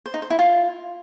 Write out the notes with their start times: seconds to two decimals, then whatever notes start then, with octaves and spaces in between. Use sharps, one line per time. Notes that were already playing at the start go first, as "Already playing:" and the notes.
0.06 C5
0.14 D#4
0.22 C5
0.30 E4
0.39 F4